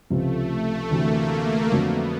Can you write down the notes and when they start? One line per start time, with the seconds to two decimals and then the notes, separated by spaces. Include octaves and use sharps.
0.10 C#2 C3 F3 A3
0.91 D2 C3 E3 A#3
1.71 F2 D3 F#3 A3 B3